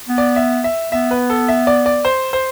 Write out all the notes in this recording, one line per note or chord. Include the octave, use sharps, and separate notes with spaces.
B3
D5
E5
E5
B3 E5
B4
A4
E5
D5
D5
C5
C5